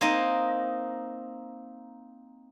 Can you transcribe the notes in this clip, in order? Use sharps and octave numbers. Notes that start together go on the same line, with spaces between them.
A#3 C4 D#4 D#5